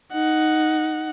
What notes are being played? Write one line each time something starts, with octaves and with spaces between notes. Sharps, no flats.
D#4 F#5